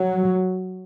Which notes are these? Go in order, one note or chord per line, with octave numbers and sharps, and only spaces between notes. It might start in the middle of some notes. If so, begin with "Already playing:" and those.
Already playing: F#3